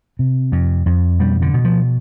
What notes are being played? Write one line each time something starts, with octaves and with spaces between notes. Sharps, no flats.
C3
F2
F2
B2 G3
D3
B2
F3